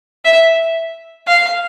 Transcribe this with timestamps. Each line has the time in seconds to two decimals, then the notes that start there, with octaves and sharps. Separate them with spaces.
0.25 E5
1.27 F5